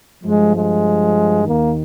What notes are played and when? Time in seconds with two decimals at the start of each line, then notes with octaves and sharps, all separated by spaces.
0.24 G2 F3 G#3
0.54 G#3
1.45 D#2 D#3 A#3